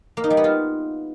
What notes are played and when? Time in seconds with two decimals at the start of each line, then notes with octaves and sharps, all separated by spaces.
0.17 A#3
0.24 D#4
0.30 G3
0.37 B3
0.44 F4